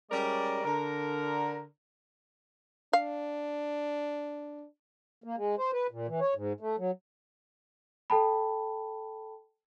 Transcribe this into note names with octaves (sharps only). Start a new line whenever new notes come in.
G3 G#3 C#4 A#4 C#5 D5
D3 A#4
D4 F5
A#3
G#3
C5
B4
A#2
E3
C#5
G#2
A3
F#3
A4 G5 A5 B5